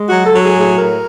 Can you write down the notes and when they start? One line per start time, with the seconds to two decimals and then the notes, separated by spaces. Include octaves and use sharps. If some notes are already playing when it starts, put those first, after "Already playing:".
Already playing: G#3
0.09 F#3 F#4
0.26 A4
0.33 F#3
0.44 G#4
0.55 A2
0.60 G#4
0.77 A2 A#4